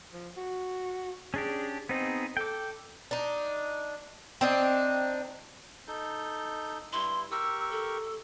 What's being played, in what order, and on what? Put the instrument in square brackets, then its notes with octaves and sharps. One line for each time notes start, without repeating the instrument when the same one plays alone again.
[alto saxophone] F3
F#4
[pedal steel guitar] C#4 D4 G4 [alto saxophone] G#4
[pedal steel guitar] B3 D#4 G#4 [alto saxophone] C4
[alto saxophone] A4 [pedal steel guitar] G5 D6
[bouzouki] D4 D#4
C4 D4 D#4
[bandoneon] D#4 A4 G6
[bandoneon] G2 E4 [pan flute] C6
[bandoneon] G4 A#4 C#6 [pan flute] E6
[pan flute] A4